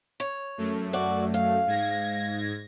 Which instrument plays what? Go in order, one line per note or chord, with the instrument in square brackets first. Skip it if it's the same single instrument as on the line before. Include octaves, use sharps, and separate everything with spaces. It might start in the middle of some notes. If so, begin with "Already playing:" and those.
[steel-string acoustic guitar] C#5
[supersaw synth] F#2 A3
[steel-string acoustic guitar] F#4 D5
F5
[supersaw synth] G#2 G#6 A#6